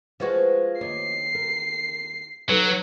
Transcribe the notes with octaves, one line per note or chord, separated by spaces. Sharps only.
F3 G#3 F#4 B4 C#5
D#2 C#5 D#5 C7
A#4
F#3 D#4 A4 B4